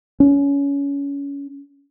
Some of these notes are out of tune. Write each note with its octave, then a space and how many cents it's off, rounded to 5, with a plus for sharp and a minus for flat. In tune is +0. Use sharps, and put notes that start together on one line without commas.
C#4 +25